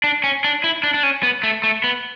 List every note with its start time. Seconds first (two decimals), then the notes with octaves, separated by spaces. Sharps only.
0.04 D4
0.24 C#4
0.44 D4
0.64 E4
0.83 D4
0.94 D4
1.03 C#4
1.23 B3
1.43 A3
1.64 A3
1.84 B3